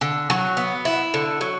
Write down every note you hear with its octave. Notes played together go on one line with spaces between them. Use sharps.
D3
F#3
B3
E4
D3
F#3